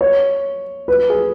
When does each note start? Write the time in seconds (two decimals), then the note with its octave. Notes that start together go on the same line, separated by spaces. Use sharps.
0.01 C#5
0.88 B4
1.10 G#4